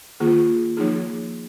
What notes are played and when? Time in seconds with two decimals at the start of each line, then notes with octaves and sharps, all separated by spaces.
0.20 D#3 A#3 F4 G#4
0.77 F3 A#3 D#4 G#4